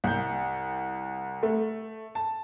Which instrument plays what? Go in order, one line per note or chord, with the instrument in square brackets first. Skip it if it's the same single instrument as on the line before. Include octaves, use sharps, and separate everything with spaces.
[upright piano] C2 G6
[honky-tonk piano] A3
[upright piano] A5